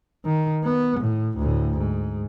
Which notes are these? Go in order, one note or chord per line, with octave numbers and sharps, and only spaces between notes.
D#3
B3
A2
D2 A2
G#2